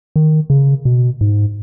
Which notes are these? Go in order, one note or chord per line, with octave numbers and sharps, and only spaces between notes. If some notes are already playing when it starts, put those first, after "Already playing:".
D#3
C#3
B2
G#2